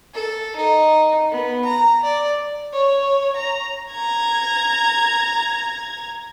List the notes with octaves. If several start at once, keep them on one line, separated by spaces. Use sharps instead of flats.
A4
D#4
B3
A#5
D5
C#5
A#5
A#5 G#6